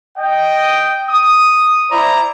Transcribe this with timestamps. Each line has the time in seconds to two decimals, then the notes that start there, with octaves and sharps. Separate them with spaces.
0.18 D#5 G5
1.10 D#6
1.91 E4 C5 D5 A#5